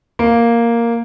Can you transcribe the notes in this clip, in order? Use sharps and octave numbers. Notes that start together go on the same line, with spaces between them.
A#3